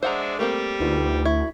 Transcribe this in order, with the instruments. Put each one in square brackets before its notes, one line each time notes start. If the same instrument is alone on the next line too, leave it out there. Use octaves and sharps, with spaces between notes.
[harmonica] G#3 D4 E5 [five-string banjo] C5 F#5 A#5
[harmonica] G3 G4 [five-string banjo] A3 A#3 C4
[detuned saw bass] D2 [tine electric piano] D#4 F4 B4
[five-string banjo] E4 [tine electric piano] C#6 G#6